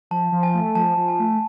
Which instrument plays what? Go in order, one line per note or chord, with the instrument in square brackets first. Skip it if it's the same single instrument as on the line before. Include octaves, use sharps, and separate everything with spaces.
[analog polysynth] F3 [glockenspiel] A5
[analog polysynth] F3
[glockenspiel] G#5
[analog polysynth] A3
[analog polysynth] F3 [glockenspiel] A5
[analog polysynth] F3
[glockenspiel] G#5
[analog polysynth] A3